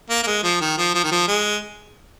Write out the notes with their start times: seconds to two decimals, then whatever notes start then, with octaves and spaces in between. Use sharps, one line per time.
0.10 A#3
0.23 A#3
0.27 G#3
0.44 F3
0.61 D#3
0.78 F3
0.94 F3
1.04 D#3
1.11 F3
1.28 G#3